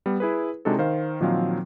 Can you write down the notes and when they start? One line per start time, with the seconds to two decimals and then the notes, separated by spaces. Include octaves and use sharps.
0.06 G3 B3
0.20 E4 G#4 B4
0.65 C3 G#3 D4 D#4 F#4 A4
0.79 D#3 C5 F5
1.20 A#2 D#3 F3 F#3 C4 F5